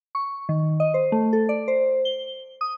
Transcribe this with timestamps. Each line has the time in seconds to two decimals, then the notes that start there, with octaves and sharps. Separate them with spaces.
0.15 C#6
0.49 D#3
0.80 D#5
0.94 C5
1.12 A3
1.33 A4
1.49 D5
1.68 C5
2.05 G7
2.61 D#6